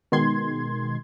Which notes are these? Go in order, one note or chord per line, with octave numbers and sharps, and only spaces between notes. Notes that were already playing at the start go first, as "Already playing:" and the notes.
B2 D#3 G#3 C6 G#6